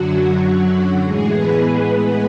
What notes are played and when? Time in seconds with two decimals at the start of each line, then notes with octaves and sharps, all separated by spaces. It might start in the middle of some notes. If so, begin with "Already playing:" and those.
Already playing: F#2 D3 F#3 F#4
1.04 A2 E3 G#3 G#4
1.32 B3 B4